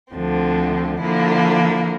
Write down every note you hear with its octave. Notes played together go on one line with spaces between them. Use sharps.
D2 D3 F3 C4
D3 F3 A#3 E4